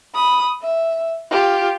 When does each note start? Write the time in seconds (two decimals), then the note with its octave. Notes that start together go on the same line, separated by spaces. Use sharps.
0.14 B5 D#6
0.62 E5
1.31 F4 G4